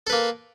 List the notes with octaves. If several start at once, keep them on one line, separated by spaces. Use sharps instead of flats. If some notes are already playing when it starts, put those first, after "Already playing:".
A#3 A4 B4